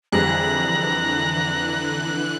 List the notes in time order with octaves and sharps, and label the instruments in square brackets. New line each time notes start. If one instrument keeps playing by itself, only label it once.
[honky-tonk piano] F2 G3 G#4 [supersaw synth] D3 E3 [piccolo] A#5 [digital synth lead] F#6